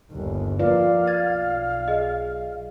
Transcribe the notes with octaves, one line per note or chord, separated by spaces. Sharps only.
G1 D#2
F2 A#3 F4 B4 D5 F5
B1 G#6 A6
G#4 D#5